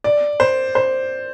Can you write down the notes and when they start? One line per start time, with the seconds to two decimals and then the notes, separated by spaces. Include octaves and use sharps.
0.04 D5
0.40 C5
0.75 C5